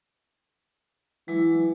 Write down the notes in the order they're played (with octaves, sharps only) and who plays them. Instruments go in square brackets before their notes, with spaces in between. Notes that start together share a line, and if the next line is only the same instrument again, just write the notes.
[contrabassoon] E3 [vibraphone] F#3 G#3 E4